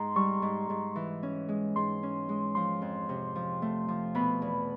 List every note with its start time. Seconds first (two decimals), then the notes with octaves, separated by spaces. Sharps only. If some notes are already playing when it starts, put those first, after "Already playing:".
Already playing: G#2 A#5 C6
0.16 G3 C#6
0.42 G#2
0.70 G#2
0.96 E3
1.23 C#4
1.49 G#3
1.76 G#2 C6
2.03 C#4
2.29 G#3
2.55 F3 C6
2.82 F2
3.09 C3
3.36 F3
3.62 A3
3.88 F3
4.15 B2 B5
4.42 E2